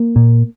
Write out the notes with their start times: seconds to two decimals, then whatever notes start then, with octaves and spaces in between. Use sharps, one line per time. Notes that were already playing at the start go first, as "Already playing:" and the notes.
Already playing: A#3
0.16 A#2